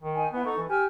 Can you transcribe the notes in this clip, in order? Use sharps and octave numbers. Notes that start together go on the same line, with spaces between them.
D#3
D#4 G#5
B3 E4 B4 F#5
D#4 A4 C#6
E3
G4 G#5 E6 F6